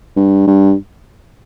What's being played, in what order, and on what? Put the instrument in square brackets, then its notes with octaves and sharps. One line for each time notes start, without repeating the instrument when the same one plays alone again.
[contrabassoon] G2
G2